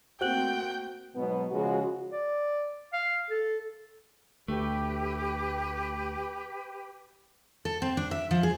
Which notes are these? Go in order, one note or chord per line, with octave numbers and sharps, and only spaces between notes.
A3 A#3 C4 F#4 C5 G5 F#6 F#7
G#2 B2 F#3 B3
C#3 F3 G#3 F#4
D5
F5
A4
D2 A3 G4 B4
A4
C4
D4
E5
F3
G#4